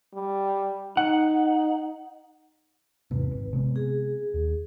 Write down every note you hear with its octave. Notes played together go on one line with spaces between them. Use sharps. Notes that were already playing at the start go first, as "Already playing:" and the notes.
G3
D#4 F#5
E2 G#2 C3 B4
G#1
C3 G#3 B3
G#4
D#2